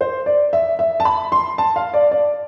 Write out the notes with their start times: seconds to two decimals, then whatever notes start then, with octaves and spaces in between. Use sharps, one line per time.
0.01 C5
0.26 D5
0.53 E5
0.79 E5
1.00 A5
1.05 B5
1.32 C6
1.58 A5
1.76 F5
1.94 D5
2.11 D5